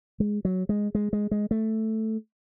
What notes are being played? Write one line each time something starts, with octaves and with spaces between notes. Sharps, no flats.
G#3
F#3
G#3
G#3
G#3
G#3
A3